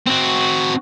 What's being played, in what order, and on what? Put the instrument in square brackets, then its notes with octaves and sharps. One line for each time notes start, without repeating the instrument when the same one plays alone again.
[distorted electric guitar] C4 F#4